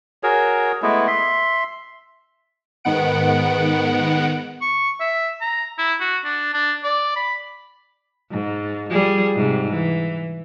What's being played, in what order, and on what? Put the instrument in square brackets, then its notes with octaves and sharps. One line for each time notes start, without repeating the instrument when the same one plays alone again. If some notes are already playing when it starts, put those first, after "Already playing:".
[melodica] F#4 G#4 A#4 C#5
G#3 A3 B3 E4
E5 C6
[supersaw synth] G#2 D#3 B3 F#5 D7
[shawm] C#6
E5
A#5
E4
F#4
D4
D4
D5
B5
[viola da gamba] G#2
F3 G3 G#4
G#2 C3
E3